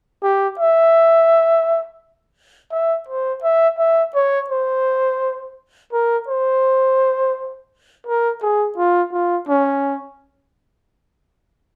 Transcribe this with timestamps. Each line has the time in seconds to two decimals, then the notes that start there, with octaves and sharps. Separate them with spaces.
0.23 G4
0.59 E5
2.72 E5
3.09 C5
3.44 E5
3.79 E5
4.15 C#5
4.50 C5
5.93 A#4
6.28 C5
8.06 A#4
8.42 G#4
8.78 F4
9.13 F4
9.49 C#4